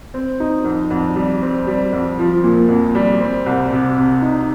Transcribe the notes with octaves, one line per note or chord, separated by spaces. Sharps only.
C4
D#4
F2
F2
G3
C4
G3
F2
F3
A#2
F2
G3
C4
C2
C3
C3
D#4